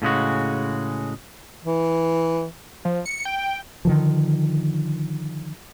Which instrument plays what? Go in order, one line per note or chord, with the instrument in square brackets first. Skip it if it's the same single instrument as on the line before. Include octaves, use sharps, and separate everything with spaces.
[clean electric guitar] A2 C#3 G#3 F#4
[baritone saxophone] E3
[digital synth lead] F3
C#7
G5
[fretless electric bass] D3 D#3 F3